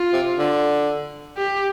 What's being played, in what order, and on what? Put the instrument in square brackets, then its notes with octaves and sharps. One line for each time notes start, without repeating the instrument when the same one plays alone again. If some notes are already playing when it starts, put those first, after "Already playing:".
Already playing: [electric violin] F4
[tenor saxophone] C3
D3
[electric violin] G4